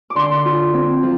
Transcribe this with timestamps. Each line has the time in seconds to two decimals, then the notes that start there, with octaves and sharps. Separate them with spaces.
0.10 D6
0.15 D3 C6
0.45 F4
0.74 C4
1.03 F3